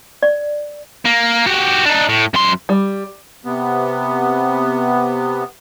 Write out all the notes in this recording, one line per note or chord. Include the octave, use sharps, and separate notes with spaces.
D5
A#3
F#4 G4
D4 D#4
A2
F#2 C6
G3
C3 B3